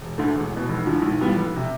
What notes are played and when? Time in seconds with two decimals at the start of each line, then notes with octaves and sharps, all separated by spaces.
0.01 E1
0.18 D2 D3 A3
0.35 E1
0.52 E2 B2
0.69 F1
0.86 E2 D3 F3
1.02 B1
1.20 A2 G3 B3 F4
1.36 F1
1.56 C3